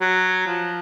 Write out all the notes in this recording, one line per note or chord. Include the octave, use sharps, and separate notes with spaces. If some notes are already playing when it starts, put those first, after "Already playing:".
F#3
F3